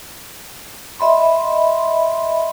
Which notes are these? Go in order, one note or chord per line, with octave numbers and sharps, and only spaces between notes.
D#5 E5 B5 C6